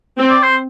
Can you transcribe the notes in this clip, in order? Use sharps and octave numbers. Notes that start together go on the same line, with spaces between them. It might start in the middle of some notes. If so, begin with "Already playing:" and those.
C4
D5
C5